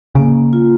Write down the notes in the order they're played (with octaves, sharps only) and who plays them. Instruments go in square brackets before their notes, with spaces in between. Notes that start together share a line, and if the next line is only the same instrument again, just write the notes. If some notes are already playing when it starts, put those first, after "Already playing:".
[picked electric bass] C#3 [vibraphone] A#3
[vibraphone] F4